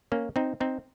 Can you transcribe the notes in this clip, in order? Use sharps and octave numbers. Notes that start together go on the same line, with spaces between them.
A#3 C#4
C4 D#4
C4 D#4